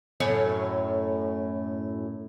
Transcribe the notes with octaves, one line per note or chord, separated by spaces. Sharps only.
F#2 A2 C#5